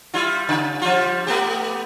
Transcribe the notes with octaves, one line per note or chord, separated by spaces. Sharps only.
G3 E4 F4
C#3
F3 G3 F4
A3 B3 G4